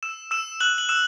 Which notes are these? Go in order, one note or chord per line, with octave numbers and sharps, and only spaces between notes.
E6 E7
E6 E7
F#6 F#7
F#7
E6 E7